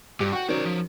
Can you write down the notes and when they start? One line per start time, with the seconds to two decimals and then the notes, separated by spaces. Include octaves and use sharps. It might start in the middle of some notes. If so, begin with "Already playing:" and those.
0.20 G2 G4
0.33 F#4 G5 C#6
0.49 D#3 F#3 C#4 C5 D5
0.65 F3